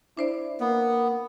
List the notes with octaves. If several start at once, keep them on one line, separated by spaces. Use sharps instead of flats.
D4 E4 C5 D5
A#3 B3